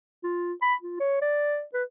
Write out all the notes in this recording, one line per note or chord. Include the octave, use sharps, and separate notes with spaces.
F4
B5
F4
C#5
D5
B4